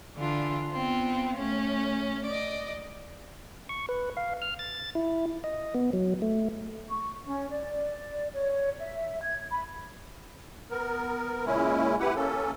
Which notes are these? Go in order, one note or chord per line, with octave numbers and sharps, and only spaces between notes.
D3 E3 D4 F4
B3 C4 F4
A3 C#4
D5 D#5
C#6
B4
F5
F6
A6
E4
D#5
B3
F#3
A3
C#6
C#4
D5
C#5
E5
G#6
B5
B3 A#4
A#2 C#3 G#3 C#4 E4
E4 G4 B4 F#5
A#3 C#4 A4